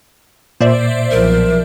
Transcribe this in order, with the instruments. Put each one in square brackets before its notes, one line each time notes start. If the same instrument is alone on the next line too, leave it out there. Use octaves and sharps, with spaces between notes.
[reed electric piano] A#2 [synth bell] C5 D5 E5
[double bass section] B1 F3 [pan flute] A#4